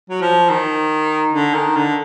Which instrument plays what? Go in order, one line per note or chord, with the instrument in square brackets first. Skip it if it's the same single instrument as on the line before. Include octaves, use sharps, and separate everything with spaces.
[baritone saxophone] F#3
F3
D#3
D3
D#3
D3